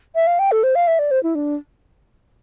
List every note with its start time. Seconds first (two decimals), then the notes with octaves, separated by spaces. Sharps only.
0.15 E5
0.27 F5
0.39 G5
0.52 A4
0.63 C5
0.75 F5
0.87 E5
0.99 D5
1.11 C5
1.23 E4
1.35 D4